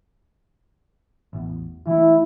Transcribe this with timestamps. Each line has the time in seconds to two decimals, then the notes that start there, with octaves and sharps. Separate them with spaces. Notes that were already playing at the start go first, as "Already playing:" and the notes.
1.33 A1 E2
1.87 E3 A3 E4